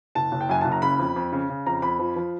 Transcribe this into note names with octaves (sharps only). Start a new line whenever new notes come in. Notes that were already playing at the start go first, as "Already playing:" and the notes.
F#1 A5
F#1
G5
F#2 G#5
F#1 A5
A#5
C#3 B5
F2
F2
C#3
C#3
F2 A#5
F2 B5
F3
F3